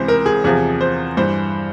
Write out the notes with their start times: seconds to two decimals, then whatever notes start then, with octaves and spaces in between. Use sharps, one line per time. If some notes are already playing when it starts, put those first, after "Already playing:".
Already playing: C#2 C3 E3 C5
0.08 A#4
0.26 G#4
0.44 E2 C3 F3 G#4
0.81 C5
1.17 G2 E3 C5